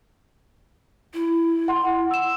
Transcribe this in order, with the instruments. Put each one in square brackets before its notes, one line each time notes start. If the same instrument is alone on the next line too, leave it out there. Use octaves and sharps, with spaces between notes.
[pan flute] E4
[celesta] F#5 C6
E6 E7